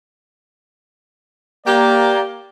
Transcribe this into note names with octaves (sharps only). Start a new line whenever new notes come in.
A#3 G4 D5